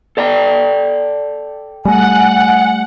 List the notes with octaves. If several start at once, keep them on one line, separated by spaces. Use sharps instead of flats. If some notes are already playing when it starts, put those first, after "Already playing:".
A4 D5 G5
G3 A3 F#5 G#5